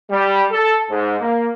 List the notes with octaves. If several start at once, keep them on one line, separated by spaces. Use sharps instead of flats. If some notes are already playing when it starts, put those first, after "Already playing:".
G3
A4
G#2
A#3